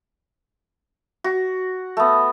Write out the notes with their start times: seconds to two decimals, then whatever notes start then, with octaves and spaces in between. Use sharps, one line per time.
1.24 F#4
1.97 A3 B3